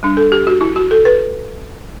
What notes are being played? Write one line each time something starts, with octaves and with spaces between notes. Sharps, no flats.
G3 D4
A4
G4
F#4
E4
F#4
A4
B4